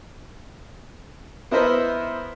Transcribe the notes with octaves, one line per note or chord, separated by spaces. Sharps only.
B3 E4 A#4 C5 D#5 E5